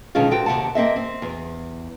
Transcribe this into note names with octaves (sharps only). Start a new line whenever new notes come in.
B2 D3 D#3 G#3 C#4 F4
C4 F#4 A4 G5
D#2 C3 B3 F#5 A5
A#3 C4 D#5 E5
C4
E2